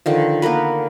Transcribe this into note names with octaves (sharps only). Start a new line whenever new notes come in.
D3 D#3 F3
A#3 B3 A#4 B4